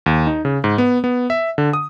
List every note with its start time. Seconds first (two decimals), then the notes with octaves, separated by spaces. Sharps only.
0.06 D#2
0.27 D#4
0.45 C#3
0.64 G#2
0.78 B3
1.04 B3
1.30 E5
1.58 D3
1.73 D#6